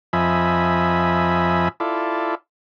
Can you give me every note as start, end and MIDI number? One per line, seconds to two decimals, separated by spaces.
0.13 1.68 41
0.13 1.68 53
0.13 1.68 75
0.13 1.68 76
0.13 1.68 80
0.13 1.68 83
1.80 2.35 64
1.80 2.35 65
1.80 2.35 69
1.80 2.35 74